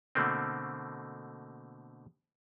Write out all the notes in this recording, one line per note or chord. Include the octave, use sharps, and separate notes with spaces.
B2 D3 A3 A#3 C4